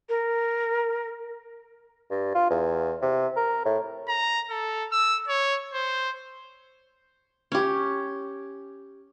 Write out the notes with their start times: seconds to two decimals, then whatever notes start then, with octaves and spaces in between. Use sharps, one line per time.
0.09 A#4
2.11 G2
2.35 F4
2.50 E2
3.02 C3
3.36 A#4
3.65 A2
4.08 A#5
4.50 A4
4.92 E6
5.28 C#5
5.73 C5
7.52 C#4 G4